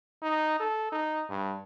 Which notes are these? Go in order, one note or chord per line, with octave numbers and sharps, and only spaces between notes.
D#4
A4
D#4
G2